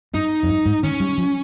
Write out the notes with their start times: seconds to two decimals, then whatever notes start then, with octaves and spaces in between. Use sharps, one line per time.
0.14 G2 D#4
0.43 F2
0.49 G2
0.66 G#2
0.83 D#3 C#4
1.00 G3
1.18 F3